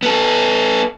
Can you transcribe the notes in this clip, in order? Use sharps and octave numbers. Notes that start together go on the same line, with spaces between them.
B3 A4